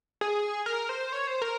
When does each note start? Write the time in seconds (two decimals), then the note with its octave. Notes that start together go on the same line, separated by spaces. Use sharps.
0.21 G#4
0.66 A#4
0.89 C5
1.13 C#5
1.27 C5
1.42 A#4